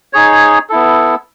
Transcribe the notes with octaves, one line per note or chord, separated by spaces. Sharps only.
D#4 G#4 C#5
B3 E4 A4